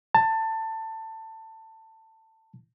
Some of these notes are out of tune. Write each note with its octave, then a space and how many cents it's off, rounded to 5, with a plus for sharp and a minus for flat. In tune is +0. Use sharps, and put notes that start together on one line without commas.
A5 +20